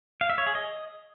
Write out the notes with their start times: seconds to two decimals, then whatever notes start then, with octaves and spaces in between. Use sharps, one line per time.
0.21 F5
0.30 E5
0.38 C#5
0.47 G#4
0.55 D#5